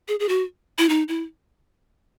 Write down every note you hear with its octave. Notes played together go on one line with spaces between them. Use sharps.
G#4
G#4
F#4
E4
D#4
E4